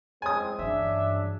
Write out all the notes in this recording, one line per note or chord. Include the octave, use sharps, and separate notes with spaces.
G#3 C4 G#5 D#6
G2 C#3 E3 F#3 D4 E5